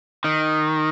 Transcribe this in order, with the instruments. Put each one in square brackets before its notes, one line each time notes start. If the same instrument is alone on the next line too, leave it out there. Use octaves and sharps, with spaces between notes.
[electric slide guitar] D#3